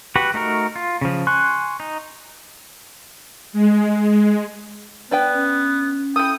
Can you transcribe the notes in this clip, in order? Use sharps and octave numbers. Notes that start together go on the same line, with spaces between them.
F#4 G4 B4 F#5
A3 D#4 F#4 A#4
F4
C#3 F3
G#5 C6 C#6 F#6
D#4
G#3
G#3
B3 D4 B4 G5
C#4
E4 A4 G5 D#6